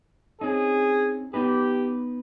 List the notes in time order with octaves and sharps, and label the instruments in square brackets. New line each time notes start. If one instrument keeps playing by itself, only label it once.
[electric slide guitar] C4 C#4 D#4 [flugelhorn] G#4
[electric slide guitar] B3 D#4 B4 [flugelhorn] G4